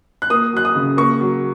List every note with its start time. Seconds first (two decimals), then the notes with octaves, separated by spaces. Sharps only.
0.22 F#6
0.30 A#3 D#6
0.53 F#3 F#6
0.65 D#6
0.75 C#3
0.97 A#3 C#6
1.20 F#3